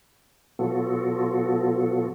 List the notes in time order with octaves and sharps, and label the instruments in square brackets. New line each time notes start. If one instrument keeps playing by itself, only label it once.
[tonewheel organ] B2 F#3 B3 F4 F#4 A4